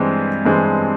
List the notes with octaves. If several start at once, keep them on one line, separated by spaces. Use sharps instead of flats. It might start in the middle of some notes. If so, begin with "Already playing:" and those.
Already playing: G2 E3 G#3 C4
G2 E3 G#3 C4